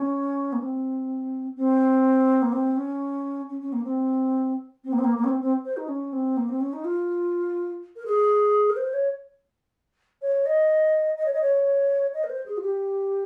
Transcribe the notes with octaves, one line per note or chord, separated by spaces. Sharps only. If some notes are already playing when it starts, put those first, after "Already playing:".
Already playing: C#4
A#3
C4
C4
A#3
C4
C#4
C#4
C#4
A#3
C4
C4
A#3
C4
A#3
A#3
C#4
C4
C4
C5
D#4
C#4
C4
A#3
C4
C#4
D#4
F4
A#4
G#4
A#4
C5
C#5
C#5
D#5
D#5
C#5
D#5
C#5
D#5
A#4
C5
G#4
F4
G4